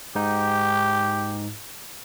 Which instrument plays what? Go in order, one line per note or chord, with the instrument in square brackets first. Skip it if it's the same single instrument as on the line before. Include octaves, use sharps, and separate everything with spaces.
[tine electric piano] G#2 D#4 [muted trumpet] G4